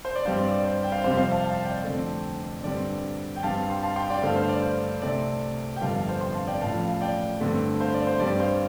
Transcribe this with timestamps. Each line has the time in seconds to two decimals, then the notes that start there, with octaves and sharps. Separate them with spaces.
0.05 C5
0.15 D5
0.25 G2 G3 C4 C5 F5
0.38 D5
0.51 D5
0.65 C5
0.83 G5
0.92 C5 F5
1.04 F2 C3 G3 C4 C5 F5
1.18 C5 F5
1.31 F5 A5
1.44 F5 A5
1.64 D5 G5
1.84 F2 D3 A3 C4
2.64 G2 D3 G3 C4 D5
3.36 G5
3.43 G2 G3 C4 F5 A5
3.70 G5 C6
3.83 F5 A5
3.96 G5 C6
4.10 D5 G5
4.22 G2 D3 A3 C5 F5
4.36 C5 F5
4.49 D5
4.62 C5
5.02 C2 C3 A3 C4 D5
5.76 G5
5.81 G1 F2 D3 G3 F5 A5
5.95 F5 A5
6.08 C5 F5
6.21 G5 C6
6.34 F5 A5
6.47 D5 G5
6.61 A1 A2 F3 F5 A5
6.88 F5 A5
7.01 D5 G5
7.40 G2 D3 A3 C4
7.81 C5 F5
7.94 D5
8.07 C5
8.20 G2 G3 C4 D5
8.39 C5 F5